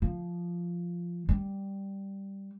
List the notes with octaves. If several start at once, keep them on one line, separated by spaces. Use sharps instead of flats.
F3
G3